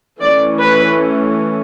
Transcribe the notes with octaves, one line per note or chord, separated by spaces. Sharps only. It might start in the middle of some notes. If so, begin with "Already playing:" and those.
E3 A3 C#4 D5
B4